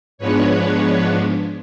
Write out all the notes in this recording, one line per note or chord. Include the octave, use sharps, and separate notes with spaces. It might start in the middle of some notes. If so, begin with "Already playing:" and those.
G#2 F3 G#3 B3 D4 B4 C#5